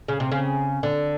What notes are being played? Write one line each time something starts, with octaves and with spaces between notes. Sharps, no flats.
C#3
C3
C#3
D3